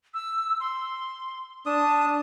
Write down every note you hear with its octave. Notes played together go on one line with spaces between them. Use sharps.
E6
C6
D4 A5 D#6